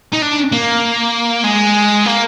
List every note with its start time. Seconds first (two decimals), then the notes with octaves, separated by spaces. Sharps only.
0.12 D#4
0.22 D4
0.52 A#3
1.44 G#3
2.06 A#3